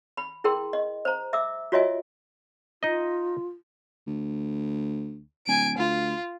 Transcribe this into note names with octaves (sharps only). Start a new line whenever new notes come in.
B5
E4 G#4 A#4 G5 C6
D#5
C5 A#5
E5 D6 E6
F4 F#4 C#5 D#5 E5 G#5
D#4 F4 D#5
D2
D1 G#5 D7
D2 F4